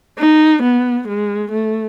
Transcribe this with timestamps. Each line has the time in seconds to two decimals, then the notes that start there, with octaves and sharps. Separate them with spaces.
0.19 D#4
0.63 B3
1.08 G#3
1.52 A3